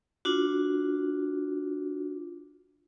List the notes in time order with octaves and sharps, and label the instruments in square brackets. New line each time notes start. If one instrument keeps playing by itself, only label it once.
[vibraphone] D4 F4 F#4